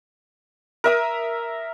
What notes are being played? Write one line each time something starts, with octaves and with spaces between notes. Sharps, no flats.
A#4 E5 D#6